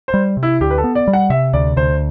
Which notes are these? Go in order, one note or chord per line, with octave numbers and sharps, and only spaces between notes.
C5
G3
C3
E4
D2 G4
B4
A4
B3
D5
G3
F#5
C3 E5
D2 D5
D2 C5